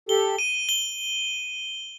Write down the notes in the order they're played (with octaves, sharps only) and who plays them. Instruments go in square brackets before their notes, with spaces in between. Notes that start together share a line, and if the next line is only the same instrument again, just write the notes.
[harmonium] G4 A4 [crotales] G7
[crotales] D#7
G7